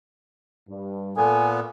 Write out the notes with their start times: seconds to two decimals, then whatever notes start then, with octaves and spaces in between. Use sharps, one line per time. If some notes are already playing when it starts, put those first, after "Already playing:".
0.69 G2
1.17 A#2 B3 A4 G#5